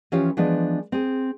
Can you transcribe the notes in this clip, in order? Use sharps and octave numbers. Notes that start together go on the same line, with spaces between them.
E3 F3 C#4 F4 G4 C#5
E3 F3 G#3 B3 D4
C4 G#4